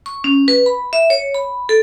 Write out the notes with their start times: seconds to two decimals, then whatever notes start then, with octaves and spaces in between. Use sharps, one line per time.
0.06 C#6
0.24 C#4
0.48 B4
0.66 B5
0.93 E5
1.10 C#5
1.34 B5
1.69 A4